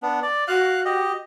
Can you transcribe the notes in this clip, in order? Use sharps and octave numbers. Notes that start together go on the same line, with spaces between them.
B3 D4
D5
F#4 F5 F#6
G4 D#5